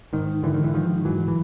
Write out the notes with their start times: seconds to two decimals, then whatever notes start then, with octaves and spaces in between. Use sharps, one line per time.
0.13 G#2 D#3
0.43 G#2 D3 E3
0.54 D#3
0.64 E3
0.74 G#2 D#3 F3
1.05 G#2 E3 F#3
1.28 E3